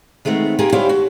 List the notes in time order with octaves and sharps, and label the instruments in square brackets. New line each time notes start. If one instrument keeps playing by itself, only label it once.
[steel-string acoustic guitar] D#3 G#3 A3 B3 C4
A#3 F4 G4 G#4 A#4
G3 C#4 E4 G4 C5 F5
F#4